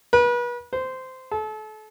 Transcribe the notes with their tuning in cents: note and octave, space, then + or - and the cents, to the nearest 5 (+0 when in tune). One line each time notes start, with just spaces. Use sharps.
B4 -35
C5 -15
A4 -35